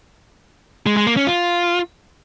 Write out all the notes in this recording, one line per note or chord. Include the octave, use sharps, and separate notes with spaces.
G#3
G#3
A#3
C#4
F4